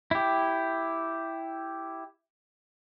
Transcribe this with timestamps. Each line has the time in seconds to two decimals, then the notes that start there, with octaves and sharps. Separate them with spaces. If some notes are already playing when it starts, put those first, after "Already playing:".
0.11 E4 G4